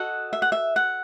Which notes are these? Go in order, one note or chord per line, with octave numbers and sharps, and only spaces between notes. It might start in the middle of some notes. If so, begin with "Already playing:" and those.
Already playing: F#4 A4 D#5 F#5
E5
F#5
E5
F#5